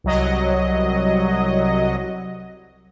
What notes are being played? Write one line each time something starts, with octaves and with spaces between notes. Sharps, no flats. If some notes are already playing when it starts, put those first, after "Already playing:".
C2 F#3 D#5